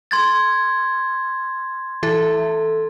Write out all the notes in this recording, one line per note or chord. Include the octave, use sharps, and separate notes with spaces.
C6 G#6 A6
E3 A4